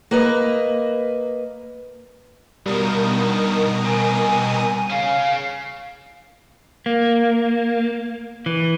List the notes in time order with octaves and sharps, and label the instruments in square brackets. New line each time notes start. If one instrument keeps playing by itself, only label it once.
[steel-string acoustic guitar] A#3 B4 D#5
[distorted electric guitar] G2 D#3 [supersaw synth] B2 A#4 D#6 [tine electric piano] G3
[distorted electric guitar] C3 D#3 [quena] G#5
[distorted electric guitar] C#3 C#4 [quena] F5
[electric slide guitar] A#3
E3